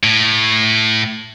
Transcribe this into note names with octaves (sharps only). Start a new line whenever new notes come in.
A2